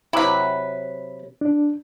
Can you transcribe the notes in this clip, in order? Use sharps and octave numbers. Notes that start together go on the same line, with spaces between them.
C3 F#3 E4 B4
D4